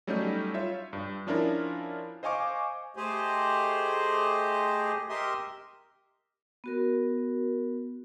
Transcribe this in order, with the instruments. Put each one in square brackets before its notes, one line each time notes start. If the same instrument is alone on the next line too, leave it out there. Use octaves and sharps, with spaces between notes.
[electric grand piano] F#3 G3 A3 C#4 D#4 G6
F4 C#5 E5
G2
F3 C#4 D4 E4 F4 A#4
C5 D#5 F5 G#5 C#6 D6
[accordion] A3 G4 G#4 C5 D#5
G4 A#4 D#5 E5 C6 D#6
[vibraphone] B3 F#4 A#4